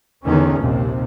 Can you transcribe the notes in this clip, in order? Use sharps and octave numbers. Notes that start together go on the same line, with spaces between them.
E2 D3 D#3 C#4
A#1 D#2 C3